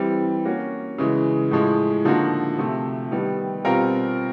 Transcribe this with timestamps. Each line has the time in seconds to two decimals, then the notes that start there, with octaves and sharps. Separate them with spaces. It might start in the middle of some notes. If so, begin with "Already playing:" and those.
Already playing: E3 G3 C4
0.45 A#3 C#4 F#4
0.98 C#3 E3 G#3
1.51 A2 F3 G#3
2.05 D3 F3 A#3 D#4 F#4
2.58 C3 F3 A3
3.11 D#3 G3 B3
3.64 B2 G3 C4 F4 A#4